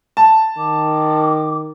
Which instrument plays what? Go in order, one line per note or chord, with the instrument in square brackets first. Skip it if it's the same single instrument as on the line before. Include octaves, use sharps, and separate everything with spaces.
[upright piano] A5
[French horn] D#3 [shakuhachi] D6